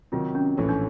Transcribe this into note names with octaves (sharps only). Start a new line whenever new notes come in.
C3 D#3 F#3 F4
C#4
A#1 A2 E3 A3 C#4
D4